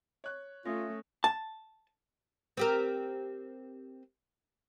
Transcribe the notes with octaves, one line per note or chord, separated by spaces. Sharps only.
C#5 F#6
A3 C#4 F4 E5 D#6 A#6
A5
C4 G4 A#4